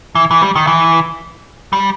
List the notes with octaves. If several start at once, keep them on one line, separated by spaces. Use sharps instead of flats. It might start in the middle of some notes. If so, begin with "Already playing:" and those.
E3
E3
G3
D#3
E3
G3